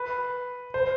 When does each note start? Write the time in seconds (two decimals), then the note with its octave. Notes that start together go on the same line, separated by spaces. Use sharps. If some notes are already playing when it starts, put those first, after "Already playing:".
Already playing: B4
0.74 C5